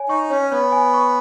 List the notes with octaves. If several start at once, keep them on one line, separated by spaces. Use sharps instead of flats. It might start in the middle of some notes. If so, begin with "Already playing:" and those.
Already playing: C#5 G#5
D#4 C#6
C#4 C#5
B3 C#5
G#5
C#6